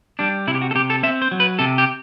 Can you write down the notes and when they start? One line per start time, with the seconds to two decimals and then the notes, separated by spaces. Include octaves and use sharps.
0.19 G3 D4
0.47 C3 E4
0.55 G4
0.61 F#4
0.71 A4
0.75 C3 G4
0.90 A4
1.03 C4 E5
1.22 C5
1.31 F#3
1.40 B4
1.59 C3 A4
1.78 G4